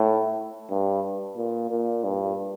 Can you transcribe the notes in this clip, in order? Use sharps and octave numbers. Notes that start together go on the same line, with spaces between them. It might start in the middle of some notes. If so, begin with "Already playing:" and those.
Already playing: A2
G2
A#2
A#2
G2